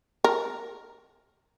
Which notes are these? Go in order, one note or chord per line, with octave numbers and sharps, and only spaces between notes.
A#4